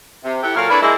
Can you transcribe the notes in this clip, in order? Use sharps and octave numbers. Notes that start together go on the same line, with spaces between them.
C3
E4 G4 A4 E5 F#5
A#2 F#3 A4 A#4 F5
D4 E4 A4 B4 C#5 D5
G#3 A#3 D4 E4